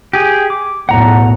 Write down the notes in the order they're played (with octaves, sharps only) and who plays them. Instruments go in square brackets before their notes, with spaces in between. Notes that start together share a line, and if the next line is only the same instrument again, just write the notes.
[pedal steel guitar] G4 G#4
D6
[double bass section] B1 E2 A2 [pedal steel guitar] F#5 A#5